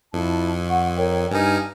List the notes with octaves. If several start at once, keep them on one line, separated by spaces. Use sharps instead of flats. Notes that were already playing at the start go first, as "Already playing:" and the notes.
F2 E4 A5
F#5 C#6
A#4 C#5 G5
G2 D#4 G#5 F6